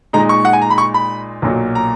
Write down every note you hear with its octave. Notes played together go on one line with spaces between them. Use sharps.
A#2 G#3 D#4 A#5
C#6
F#5
G#5
A#5
B5
C#6
B5
B1 A#2 F#3 A#3
A#5